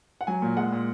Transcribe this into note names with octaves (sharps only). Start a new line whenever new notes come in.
F#5
F#3 G#5
A#2
G#3 F#5
A#2